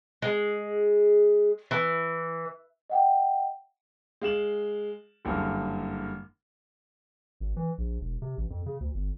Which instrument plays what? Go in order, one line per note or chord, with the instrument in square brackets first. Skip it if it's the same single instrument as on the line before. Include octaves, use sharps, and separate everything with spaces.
[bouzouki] G#3
E3
[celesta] D#5 F#5 G5
[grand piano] G#3 F5 E7 F#7
F#1 G2 D3
[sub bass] G#1
E3
A#1
E1
C3
A1
F2
C#3
D2
G1